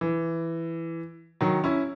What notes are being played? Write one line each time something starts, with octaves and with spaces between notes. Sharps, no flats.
E3
D#3 F#3
C#4 E4